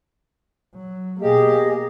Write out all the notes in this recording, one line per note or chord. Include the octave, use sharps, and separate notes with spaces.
F#3
B2 A#3 G4 G#4 D#5